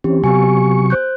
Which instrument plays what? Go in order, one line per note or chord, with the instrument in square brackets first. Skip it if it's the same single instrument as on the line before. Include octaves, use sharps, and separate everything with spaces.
[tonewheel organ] E3 C4 C#4 [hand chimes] G4
[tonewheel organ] C3 F#3 C#6 [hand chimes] B3 G4 G#5
[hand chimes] C5 F#6 G6